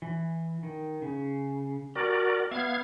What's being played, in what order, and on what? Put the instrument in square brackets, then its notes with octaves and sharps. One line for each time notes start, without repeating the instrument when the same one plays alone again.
[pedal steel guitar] E3
D#3
C#3
[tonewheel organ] F#4 A#4 D5 [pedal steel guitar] G4 A5
[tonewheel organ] B3 F5 G#6 [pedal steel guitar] E5 B5